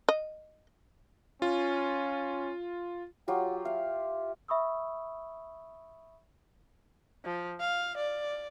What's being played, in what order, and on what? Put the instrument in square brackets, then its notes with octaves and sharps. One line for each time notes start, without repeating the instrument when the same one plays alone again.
[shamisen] D#5
[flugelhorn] C#4 [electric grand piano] F4
[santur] F#3 F4 G4 [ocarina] F#5
[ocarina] E5 [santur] F5
[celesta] E5 B5 C#6 D#6 E6
[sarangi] F3
F5
D5